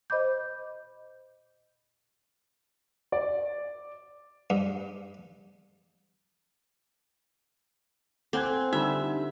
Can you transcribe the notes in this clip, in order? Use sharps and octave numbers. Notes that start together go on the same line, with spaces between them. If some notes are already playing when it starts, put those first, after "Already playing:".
C5 D#5 B5 D6 G6
D5
G2
C4 A4 F#5 G#5 D6 F#6 G#6
D3 G3 D#4 F4 E5 E6